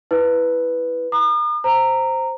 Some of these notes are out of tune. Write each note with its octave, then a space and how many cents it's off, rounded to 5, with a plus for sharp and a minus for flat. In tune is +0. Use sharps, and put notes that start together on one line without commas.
E4 +0 B4 +0
A#5 +15 D#6 -45
C5 +0 A#5 -15